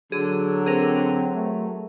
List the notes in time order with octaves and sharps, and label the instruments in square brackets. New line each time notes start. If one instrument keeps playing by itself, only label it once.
[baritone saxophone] D3 [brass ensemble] F#3 [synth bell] G#4
[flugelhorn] C4 [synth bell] G#4 A#4
[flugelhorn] A3